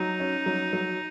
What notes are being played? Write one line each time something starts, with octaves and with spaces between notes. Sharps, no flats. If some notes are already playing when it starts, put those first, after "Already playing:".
Already playing: F#3 D#4
C#4
F#3
F#3